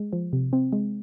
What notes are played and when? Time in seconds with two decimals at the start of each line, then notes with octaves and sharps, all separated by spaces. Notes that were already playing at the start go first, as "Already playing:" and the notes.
Already playing: G#3
0.13 F3
0.33 C3
0.53 C4
0.73 G#3